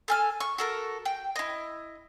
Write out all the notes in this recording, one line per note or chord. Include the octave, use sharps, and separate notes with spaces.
A4 G#5 F6
C#6
F#4 A4 A#4
G5
E4 D#5